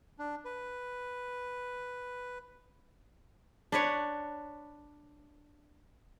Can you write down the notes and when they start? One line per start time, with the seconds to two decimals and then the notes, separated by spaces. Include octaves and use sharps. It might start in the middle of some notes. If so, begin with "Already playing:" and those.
0.19 D4
0.45 B4
3.72 D4 B4 C#5